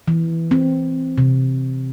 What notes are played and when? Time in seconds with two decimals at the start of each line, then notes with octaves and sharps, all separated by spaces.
0.08 E3
0.51 C4
1.18 C3